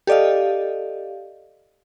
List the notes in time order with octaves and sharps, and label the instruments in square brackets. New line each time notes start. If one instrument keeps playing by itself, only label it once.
[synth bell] G4 A4 D5 D#5 F5